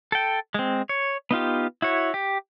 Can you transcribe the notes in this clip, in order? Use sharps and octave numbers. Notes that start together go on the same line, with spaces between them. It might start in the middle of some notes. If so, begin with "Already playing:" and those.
A4 G5
G#3 C4
C#5
B3 D#4 F4 G4
E4 F#4 C#5
G4